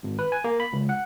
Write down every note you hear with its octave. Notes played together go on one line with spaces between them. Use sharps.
G#1
B4
G#5
A#3
B5
C#2
F#5